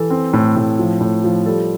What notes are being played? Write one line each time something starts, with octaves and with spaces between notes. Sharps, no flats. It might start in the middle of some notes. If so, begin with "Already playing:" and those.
Already playing: E3 A4
C4
A2
A2
F3
A2
F3
G3 A4